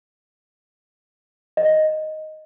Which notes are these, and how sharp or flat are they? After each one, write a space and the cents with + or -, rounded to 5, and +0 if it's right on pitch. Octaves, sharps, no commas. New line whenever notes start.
D#5 +0